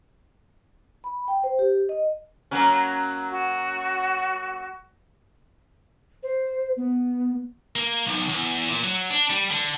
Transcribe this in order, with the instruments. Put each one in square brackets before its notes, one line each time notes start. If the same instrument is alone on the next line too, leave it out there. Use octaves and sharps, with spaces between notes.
[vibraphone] B5
G5
C5
G4
D#5
[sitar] F#3 A#3 C#4
[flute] F#4
[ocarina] C5
B3
[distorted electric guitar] A#3
B1
E2
A#2
F#3
D4
G3
D3